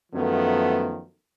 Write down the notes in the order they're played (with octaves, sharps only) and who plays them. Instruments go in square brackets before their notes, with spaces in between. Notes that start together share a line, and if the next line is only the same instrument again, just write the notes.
[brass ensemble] F#2 D#3 F3 A3 B3